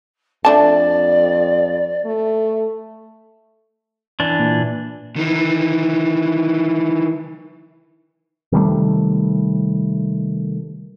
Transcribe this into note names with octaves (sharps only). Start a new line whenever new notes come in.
F2 A3 D4 D5 A5
A3
E3 D4
A#2
D#3 E3
C3 D#3 G3 A3